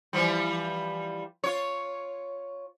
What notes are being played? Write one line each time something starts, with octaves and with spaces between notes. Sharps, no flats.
E3 F3 G3
F4 C#5